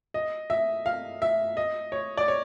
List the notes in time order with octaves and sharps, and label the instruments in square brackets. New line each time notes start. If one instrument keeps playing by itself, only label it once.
[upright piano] D#5
E5
F5
E5
D#5
C#5
D5
C#5